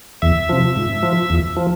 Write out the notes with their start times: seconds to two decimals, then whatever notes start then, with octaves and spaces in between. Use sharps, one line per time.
0.22 E2 E5
0.49 C3 F3
0.76 G#2
1.03 F3
1.30 E2
1.57 F3